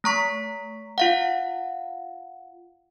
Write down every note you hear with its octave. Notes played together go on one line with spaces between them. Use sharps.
A3 A#5 C#6 B6
F4 F5 F#5